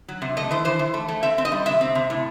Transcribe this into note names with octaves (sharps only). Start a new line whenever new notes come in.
F#3
C3
A3 D#5
E3 C5
E3 C5
E3
A3
A3
C4 E5
C4
D#5
G3
C3 E5
C4
C3
A2